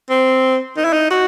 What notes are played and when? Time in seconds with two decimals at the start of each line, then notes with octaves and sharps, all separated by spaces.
0.10 C4
0.77 D#4
0.85 E4
0.93 D#4
1.11 F#4